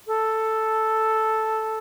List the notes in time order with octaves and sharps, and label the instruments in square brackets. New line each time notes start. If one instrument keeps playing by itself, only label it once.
[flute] A4